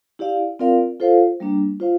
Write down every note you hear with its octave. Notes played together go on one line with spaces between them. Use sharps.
E4 G4 D5 F5
C4 F4 A#4 D5 F5
F4 A4 C5 F5
G3 A#3 D4
F4 C5 F5